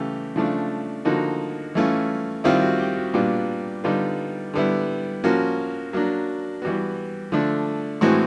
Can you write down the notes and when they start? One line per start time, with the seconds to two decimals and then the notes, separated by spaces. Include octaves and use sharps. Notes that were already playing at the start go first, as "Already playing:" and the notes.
Already playing: C#3 E3 A3 G4
0.36 C#3 F3 A3 D4
1.05 D3 F3 A#3 D#4 F#4
1.75 E3 A3 C#4 F4
2.44 D#3 G3 C4 E4 F4
2.61 F#4
2.80 G4
2.96 F#4
3.14 A#2 G3 B3 D4 F4
3.84 D3 G3 B3 D#4 F4
4.54 D3 G3 B3 E4
5.24 F3 A#3 C#4 F#4
5.93 F#3 A#3 D4
6.62 E3 G3 B3 F#4
7.32 D3 F3 A3 D4
8.01 A2 E3 G#3 C4 F#4